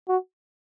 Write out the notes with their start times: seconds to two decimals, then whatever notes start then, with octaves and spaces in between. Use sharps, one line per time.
0.08 F#4